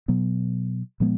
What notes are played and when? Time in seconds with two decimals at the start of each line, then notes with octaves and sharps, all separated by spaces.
0.08 B2 F#3 B3
1.00 A#2 F3 G#3 B3